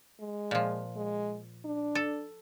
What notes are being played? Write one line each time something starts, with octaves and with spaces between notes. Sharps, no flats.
G#3
A#2 F3
G#3
D4
A4